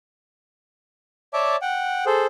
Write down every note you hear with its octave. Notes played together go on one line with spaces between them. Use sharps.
C#5 D5 E5 A5 D6
F#5 G5
G#4 A4 C5